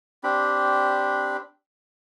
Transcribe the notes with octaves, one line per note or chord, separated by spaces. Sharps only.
C4 D4 G4 B5